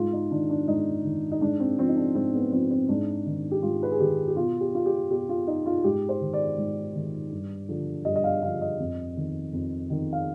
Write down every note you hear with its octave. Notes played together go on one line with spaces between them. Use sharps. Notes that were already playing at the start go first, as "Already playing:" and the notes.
Already playing: G#2 F4
D#4
D#3 D4
D4
G#2 D#4
D#3
D#4
G#2 D4
C4
F3 C4
D#4
D4
G#2 C4
B3
F3 C4
C4
G#2 D4
D#3
G4
G#2 F4
B4
G#4
D#3 G4
G4
B2 F4
G4
F4
G4
B2 G4
F4
D#4
F4
G#2 G4
C5
D#3
D5
G#2
D#3
G2
D3 F3
G2 D#5
D#5
F5
D3 F3 F5
D#5
F2
D#3
F2
D#3
F5